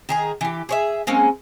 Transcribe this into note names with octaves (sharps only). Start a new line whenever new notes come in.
D#3 G#4 A#5
E3 G4
G#4 C#5 E5
G#3 A#3 C4 C#4